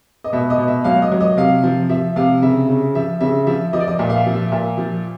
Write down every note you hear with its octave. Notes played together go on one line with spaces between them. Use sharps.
D#5
B2 E5
D#5
B2
E5
F#3 F5
D#5
F#3
D#5
C3 F5
F3
F3 E5
C3 F5
C#3 E5
C#3
F3 E5
C#3 E5
F3 E5
F3 D#5
D5
D#5
A#2 E5
F5
E5
F3
E5
A#2 E5
F3